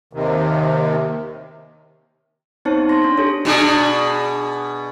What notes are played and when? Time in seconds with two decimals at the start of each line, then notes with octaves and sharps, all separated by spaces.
0.13 D#2 C3 D#3
2.65 B3 C4 D#4 C5 C#5 A5
2.89 C6 A#6
3.04 D4
3.18 G4 A4 C#5
3.45 B2 D4 G#4